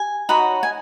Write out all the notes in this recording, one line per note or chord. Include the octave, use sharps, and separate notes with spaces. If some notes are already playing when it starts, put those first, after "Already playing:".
Already playing: G#5
D#4 F#4 C#5 F#5 B5
G#5